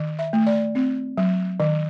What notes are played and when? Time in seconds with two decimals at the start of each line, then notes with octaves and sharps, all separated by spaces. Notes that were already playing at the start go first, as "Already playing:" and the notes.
Already playing: D#3
0.19 E5
0.33 A3
0.47 D5
0.75 C4
1.18 F#3
1.60 D#3